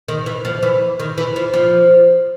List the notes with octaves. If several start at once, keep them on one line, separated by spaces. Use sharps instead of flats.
D#3
E3
F3
E3
D#3
E3
F3
F3